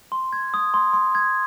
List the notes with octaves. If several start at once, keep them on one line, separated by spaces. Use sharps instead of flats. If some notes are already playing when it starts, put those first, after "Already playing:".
C6
G#6
D#6
C6
C6
G#6